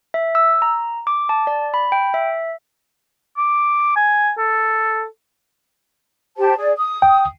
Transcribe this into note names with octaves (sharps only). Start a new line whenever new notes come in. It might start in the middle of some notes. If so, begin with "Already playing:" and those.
E5
E6
A#5
D6
A5
D5
B5
G5
E5
D6
G#5
A4
G4 C5 A5
G#4 D5
D#6
G5